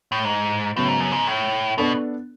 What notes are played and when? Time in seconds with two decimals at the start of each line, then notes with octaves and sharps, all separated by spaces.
0.12 A2
0.25 G#2
0.76 A2 C#3 F#3 B3
0.88 G#2
1.00 F#2
1.12 G#2
1.27 A2
1.78 B2 B3 D4 A4